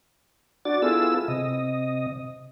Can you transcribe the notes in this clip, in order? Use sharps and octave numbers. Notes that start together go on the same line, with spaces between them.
D4 F#4 D5 A6
B3 E4 F4 G#4 A4 E6
C3 D#5